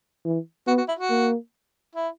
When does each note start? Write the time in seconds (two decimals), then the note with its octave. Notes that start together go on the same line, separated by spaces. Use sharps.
0.25 E3
0.67 B3 F#4
0.78 F#4
0.88 E4
0.99 F#4
1.10 A#3
1.95 E4